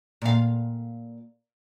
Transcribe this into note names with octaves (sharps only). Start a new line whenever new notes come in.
A#2 F5